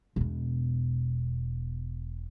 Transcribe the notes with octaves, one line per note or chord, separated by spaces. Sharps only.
E1 B2